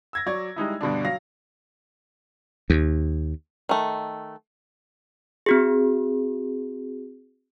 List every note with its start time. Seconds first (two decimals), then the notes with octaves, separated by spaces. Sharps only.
0.13 E6 G#6 A#6
0.26 F#3 C#5 D5 G#6
0.56 G3 G#3 D#4 E4
0.81 G2 B2 D3 D4
1.05 F#3 F5 A#6
2.70 D#2
3.69 D#3 A3
5.46 C4 F#4 G#4